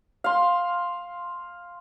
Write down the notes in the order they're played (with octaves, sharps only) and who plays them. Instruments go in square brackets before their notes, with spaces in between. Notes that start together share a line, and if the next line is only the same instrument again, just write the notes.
[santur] F5 C6